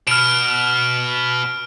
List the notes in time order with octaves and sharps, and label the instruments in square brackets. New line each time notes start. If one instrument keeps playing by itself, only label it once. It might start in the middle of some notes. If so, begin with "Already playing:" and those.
[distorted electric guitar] B2 [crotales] F6 D7